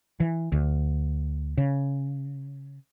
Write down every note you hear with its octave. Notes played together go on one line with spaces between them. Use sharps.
E3
D2
C#3